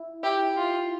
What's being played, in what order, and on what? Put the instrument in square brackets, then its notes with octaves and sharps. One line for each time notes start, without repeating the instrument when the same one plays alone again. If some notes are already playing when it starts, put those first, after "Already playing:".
Already playing: [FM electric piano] E4
[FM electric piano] E4 [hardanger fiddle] G4
[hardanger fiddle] F4